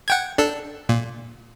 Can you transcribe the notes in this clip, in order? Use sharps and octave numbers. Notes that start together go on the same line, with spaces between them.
F#5 G5 G#6
D4 A4
A#2